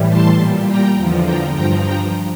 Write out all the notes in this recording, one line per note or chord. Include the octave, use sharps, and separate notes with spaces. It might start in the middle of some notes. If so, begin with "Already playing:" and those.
Already playing: A2 E3 G3
A5 C6
A#2 G3
G5 A#5
E2 D3 F3
G5 A#5
G2 F3 G5 A#5
G5 A#5